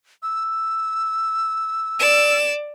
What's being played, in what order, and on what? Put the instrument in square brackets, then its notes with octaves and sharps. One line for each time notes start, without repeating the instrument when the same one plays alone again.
[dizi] E6
[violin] D5 E7